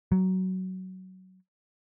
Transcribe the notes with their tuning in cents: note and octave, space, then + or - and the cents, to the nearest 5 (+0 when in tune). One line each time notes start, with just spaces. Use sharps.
F#3 +15